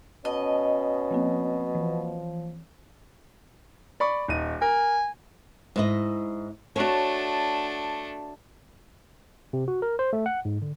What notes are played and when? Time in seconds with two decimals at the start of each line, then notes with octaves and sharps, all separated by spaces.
0.25 B2 C#4 D#5 A5
1.11 F3 A#3 C4
1.75 E3 F3
4.00 D5 B5 C#6
4.28 D#1 D#4 D#7
4.62 A#4 G#5
5.76 G#2 E4 D#5
6.76 A3 D4 F#4 C#5
9.53 C3
9.68 F#4
9.82 A#4
9.99 C5
10.13 A3
10.26 F#5
10.45 G#2
10.62 D3